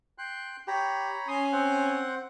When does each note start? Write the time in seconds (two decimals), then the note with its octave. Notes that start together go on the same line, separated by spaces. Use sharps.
0.18 G5 C6 F#6
0.68 G4 C#5 A#5 B5
1.28 C#4 G#5 C6 D#6
1.52 C4 C5 F#5